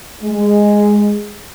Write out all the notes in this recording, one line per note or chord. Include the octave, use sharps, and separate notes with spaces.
G#3